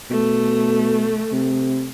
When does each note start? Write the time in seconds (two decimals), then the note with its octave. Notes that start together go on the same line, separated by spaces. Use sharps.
0.10 B2 A3
1.32 C3